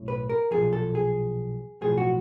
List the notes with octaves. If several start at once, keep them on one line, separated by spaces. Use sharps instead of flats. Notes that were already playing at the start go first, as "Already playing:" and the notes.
Already playing: B1 A2
B4
A#4
B1 A#2 F3 G#4
A4
G#4
B1 A2 F3 G#4
F#4